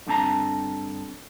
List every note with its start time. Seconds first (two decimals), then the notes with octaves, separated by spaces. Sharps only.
0.07 G2 D3 C4 A5 A#5